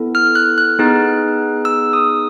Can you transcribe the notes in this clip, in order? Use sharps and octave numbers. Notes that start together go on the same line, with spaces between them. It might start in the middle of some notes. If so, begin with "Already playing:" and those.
Already playing: B3 E4 A4
F6
F#6
F#6
B3 D#4 G#4
E6
D#6